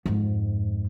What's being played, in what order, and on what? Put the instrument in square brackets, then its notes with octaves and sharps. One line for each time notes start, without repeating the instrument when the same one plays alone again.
[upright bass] F2 G#2